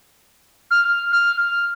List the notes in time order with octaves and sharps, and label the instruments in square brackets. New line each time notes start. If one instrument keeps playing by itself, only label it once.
[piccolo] F6
F6